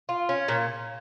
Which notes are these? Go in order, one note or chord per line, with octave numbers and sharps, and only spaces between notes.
F4
C#4
A#2 C#5